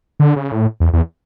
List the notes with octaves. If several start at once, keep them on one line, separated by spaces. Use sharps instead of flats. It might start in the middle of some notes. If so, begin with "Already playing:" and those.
D3
C#3
A2
E2
E2